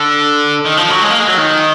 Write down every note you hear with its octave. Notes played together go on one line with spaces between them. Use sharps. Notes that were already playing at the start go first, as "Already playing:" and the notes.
Already playing: D3
D#3
F3
F#3
G#3
A#3
G#3
F#3
D#3